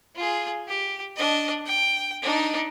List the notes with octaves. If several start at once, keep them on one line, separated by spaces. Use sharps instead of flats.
F4 G#4
G4
D4 D#5
G5
D4 D#4